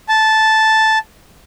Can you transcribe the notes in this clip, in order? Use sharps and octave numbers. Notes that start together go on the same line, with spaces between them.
A5